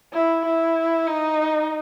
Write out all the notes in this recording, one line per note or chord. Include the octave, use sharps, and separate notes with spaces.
E4
E4
D#4